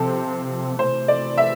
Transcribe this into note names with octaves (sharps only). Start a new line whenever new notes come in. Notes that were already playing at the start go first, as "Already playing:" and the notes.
Already playing: C3 F3 C4 A4
C3 E3 A3 C5
D5
E5